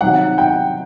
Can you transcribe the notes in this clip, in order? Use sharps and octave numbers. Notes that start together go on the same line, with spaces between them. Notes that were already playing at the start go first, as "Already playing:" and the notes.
C3 D#3 F#3 F#5
G5